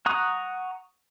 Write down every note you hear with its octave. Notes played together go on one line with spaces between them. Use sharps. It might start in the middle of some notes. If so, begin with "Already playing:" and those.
F#5 A#5 C#6 D#6 F#6